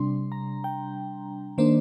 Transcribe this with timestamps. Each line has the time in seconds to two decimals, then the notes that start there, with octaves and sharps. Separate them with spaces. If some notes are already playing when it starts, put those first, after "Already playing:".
Already playing: C3 G3 D4 C6
0.32 A#5
0.64 G5
1.58 D#3 A#3 D4 C5